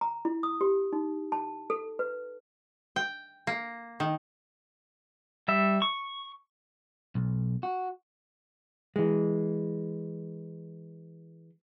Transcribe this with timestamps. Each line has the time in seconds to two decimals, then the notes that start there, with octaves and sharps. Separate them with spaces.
0.01 A#5
0.25 E4
0.43 D#6
0.61 G4
0.93 D#4
1.32 A5
1.70 A4
1.99 B4
2.96 G5
3.47 A#3
4.00 D#3
5.48 G3 E5
5.82 C#6
7.15 B1
7.63 F#4
8.96 E3 G#3